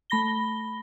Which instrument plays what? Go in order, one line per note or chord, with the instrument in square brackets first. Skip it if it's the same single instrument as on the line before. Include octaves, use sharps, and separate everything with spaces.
[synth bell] A3 B5 A#6 G7